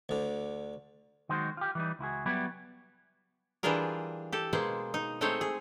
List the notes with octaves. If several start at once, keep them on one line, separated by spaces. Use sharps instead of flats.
D2 D3
D#3 F#3 G#3 F#4 C5
F4 G4
E3 G3 D#4
C#2 E4 F#4 G#4
F#3 G3 B3 E4 G4
E3 G3 D4 F4 G#4 A#4
G4 A4
B2 G#3 A#3 G#4 C5
D#4
G#3 A3 C4 D#4 C5 C#5
G#4